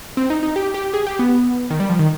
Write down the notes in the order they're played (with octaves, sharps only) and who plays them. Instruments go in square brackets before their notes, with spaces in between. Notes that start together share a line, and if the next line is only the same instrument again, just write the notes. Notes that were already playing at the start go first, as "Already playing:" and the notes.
[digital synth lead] C4
D#4
D#4
G4
G4
G#4
G4
B3
D#3
G3
F3
D#3